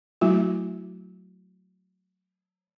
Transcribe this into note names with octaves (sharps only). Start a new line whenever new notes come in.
F#3 A3 E4 F#4